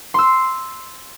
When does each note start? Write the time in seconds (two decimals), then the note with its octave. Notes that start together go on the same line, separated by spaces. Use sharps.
0.14 C6 E6